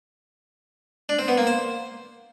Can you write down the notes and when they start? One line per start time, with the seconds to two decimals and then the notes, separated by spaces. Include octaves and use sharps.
1.09 D4
1.19 C4
1.28 B3
1.38 A#3
1.47 C5